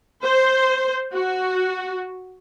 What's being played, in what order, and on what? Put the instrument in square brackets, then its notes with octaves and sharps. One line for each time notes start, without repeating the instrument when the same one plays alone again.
[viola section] C5
F#4